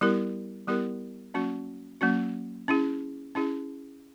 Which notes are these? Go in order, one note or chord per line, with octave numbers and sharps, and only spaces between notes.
G3 B3 E4 G4 A#4
G3 B3 E4 G4 A#4
F#3 A#3 C#4 F#4
F#3 A#3 C#4 F#4
C#4 E4 G#4
C#4 E4 G#4